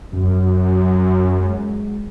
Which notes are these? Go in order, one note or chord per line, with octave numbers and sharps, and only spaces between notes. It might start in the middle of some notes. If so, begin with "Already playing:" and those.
F#2 F#3
G#3